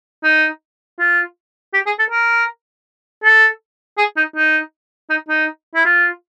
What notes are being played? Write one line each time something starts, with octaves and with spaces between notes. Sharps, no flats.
D#4
F4
G4
G#4
A4
A#4
A4
G#4
D#4
D#4
D#4
D#4
E4
F4